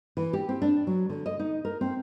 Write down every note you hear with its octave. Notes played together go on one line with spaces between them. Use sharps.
E3
G4
C4
D4
F#3
D3
D#5
D#4
A#4
C4